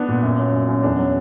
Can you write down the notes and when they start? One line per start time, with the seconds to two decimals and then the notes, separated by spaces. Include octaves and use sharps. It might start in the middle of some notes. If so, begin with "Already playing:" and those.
Already playing: B3 D4
0.09 A#2
0.23 F#2
0.39 F#3
0.53 F#2
0.69 F#2 C#4
0.83 E2 D4
0.99 F#3